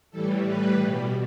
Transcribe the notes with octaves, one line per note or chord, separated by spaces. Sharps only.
A2 E3 G3 A4
A2 E3 G3 B4
B2 G3